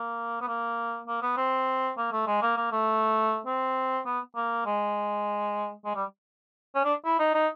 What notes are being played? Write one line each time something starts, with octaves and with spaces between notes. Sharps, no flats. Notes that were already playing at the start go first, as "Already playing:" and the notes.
Already playing: A#3
B3
A#3
A#3
B3
C4
A#3
A3
G#3
A#3
A#3
A3
C4
B3
A#3
G#3
G#3
G3
C#4
D4
E4
D#4
D#4